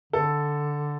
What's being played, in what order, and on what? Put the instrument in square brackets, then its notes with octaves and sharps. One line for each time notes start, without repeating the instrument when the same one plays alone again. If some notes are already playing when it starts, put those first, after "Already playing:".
[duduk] D3 [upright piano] A4